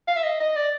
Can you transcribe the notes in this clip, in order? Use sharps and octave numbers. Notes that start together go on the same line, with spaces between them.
F5
E5
D#5
D#5
D5